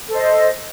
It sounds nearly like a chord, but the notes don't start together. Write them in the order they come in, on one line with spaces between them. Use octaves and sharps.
A4 C5 D#5